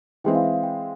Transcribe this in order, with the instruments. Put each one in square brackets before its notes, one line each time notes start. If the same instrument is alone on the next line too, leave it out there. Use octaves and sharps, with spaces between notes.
[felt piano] E3 G#3 C4 E4 [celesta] G5
[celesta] F5
E5
F5
G5